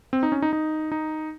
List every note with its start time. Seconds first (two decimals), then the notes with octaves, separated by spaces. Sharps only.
0.13 C4
0.23 D#4
0.32 C#4
0.42 D#4
0.53 D#4
0.92 D#4